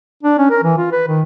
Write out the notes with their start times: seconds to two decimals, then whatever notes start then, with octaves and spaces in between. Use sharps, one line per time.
0.23 D4
0.38 C#4
0.50 A#4
0.64 E3
0.78 F4
0.92 B4
1.08 D#3